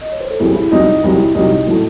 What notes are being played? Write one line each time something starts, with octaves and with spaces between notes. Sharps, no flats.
D#5
C#5
C5
A4
C2 C3 F#3 E4 G#4
E4
C2 C3 F#3 D#4
C2 C3 F#3 E4
C2 C3 F#3 D#4
A2 F#3 A3 E4